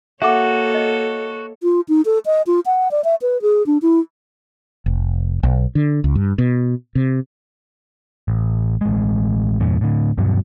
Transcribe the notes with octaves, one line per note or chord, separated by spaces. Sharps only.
A#3 F#4 A4 C#5 E5 F#5 D6
D#5
F4
D#4
A4
D#5
F4
F#5
D5
E5
B4
G#4
D4
E4
F1
B1
D3
C#2
G2
B2
C3
A1
A1 G#3
E2 G2 A#2
A2 D3
D1 G2 B2 F#3